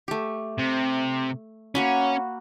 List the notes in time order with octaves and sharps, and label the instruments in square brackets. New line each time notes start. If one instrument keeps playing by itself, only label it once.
[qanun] A3 G4
[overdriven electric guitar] C3
[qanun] A#3 F#4 B5 [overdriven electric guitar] C#4